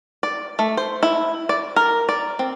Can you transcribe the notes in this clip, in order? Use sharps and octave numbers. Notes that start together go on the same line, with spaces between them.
D5
A3
C5
E4
D5
A#4
D5
C4